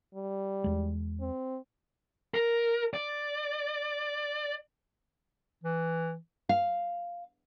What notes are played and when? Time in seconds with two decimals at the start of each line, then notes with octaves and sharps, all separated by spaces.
0.14 G3
0.64 E2 G#3
1.21 C4
2.34 A#4
2.94 D5
5.63 E3
6.49 F5